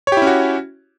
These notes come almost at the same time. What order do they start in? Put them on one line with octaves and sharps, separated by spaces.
C#5 G4 E4 C#4 F#4